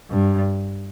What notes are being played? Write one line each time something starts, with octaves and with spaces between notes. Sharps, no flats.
G2